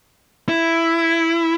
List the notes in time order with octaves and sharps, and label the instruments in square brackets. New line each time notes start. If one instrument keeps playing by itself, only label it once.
[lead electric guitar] E4